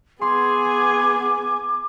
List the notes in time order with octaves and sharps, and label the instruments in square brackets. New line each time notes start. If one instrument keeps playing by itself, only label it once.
[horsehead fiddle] B3 G#5 [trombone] G#4 [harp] C6 [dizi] D6